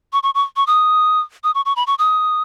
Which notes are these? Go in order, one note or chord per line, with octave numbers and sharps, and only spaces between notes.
C#6
C#6
C#6
C#6
D#6
D#6
C#6
C#6
B5
C#6
D#6